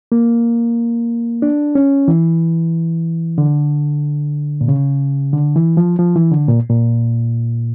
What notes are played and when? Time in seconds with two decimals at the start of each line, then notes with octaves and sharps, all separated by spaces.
0.12 A#3
1.42 D4
1.75 C#4
2.08 E3
3.38 D3
4.61 A#2
4.68 C#3
5.33 D3
5.56 E3
5.77 F3
5.99 F3
6.16 E3
6.32 D3
6.48 A#2
6.69 A#2